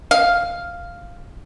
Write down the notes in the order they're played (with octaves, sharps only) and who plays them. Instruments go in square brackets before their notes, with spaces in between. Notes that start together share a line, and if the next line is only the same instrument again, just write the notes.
[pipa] F5